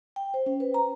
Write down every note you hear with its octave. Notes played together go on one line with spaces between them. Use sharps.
G5
C5
C#4
B4
A#5